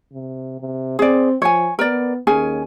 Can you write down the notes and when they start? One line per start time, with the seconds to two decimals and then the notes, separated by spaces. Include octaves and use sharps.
0.12 C3
0.60 C3
0.99 C4 G#4 D5
1.42 F3 C#5 G#5
1.79 B3 A#4 D5
2.27 D#2 C#4 G#4 G#5